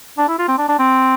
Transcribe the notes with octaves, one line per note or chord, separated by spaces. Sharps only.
D4
E4
F4
C4
D4
D4
C4